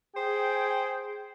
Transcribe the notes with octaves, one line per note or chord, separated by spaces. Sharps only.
G#4 C5 G5